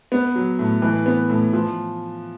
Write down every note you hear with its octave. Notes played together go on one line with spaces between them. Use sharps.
B3
F#3
A2
E3
B3
A2
F3